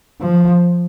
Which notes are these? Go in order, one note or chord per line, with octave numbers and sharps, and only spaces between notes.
F3